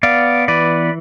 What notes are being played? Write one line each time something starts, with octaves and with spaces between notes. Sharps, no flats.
B3 D5 F5
E3 B4 D5